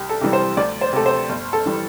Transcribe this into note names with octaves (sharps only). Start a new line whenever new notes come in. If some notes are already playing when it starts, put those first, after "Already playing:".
Already playing: C2 G4
A4
C3 E3 G3
C5
D2 D5
C5
C3 A3 A4
C5
G1
A4
E3 G3